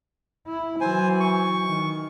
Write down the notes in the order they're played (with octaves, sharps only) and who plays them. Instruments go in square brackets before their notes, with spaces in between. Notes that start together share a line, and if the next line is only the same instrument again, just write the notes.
[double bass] E4
[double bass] E3 F#3 [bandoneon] C5 G#5
[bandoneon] C#6
[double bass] D#3